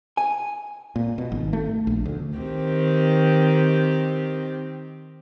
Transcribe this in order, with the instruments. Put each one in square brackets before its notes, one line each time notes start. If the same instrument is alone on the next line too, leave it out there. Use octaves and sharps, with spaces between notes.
[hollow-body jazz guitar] G#5
[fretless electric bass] A#2
B2
G#1
A3
A#1
D2
[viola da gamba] D#3 C4 G4